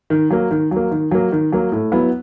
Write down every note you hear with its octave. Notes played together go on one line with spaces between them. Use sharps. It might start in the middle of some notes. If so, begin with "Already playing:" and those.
D#3
F#3 A#3
D#3
F#3
A#3
D#3
F#3 A#3
D#3
F#3 A#3
A2
F#3 B3 E4